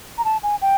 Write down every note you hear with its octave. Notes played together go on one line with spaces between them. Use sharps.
A#5
A5
G#5
G5